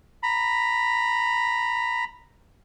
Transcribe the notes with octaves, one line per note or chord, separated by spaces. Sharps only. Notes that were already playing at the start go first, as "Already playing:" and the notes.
A#5 B5